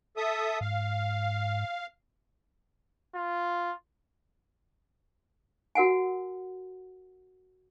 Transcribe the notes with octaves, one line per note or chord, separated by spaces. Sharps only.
A4 E5 D#6
G#2 F5
F4
F#4 A#4 F#5 G#5